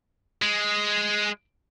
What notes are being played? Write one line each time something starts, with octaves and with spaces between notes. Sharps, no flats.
G#3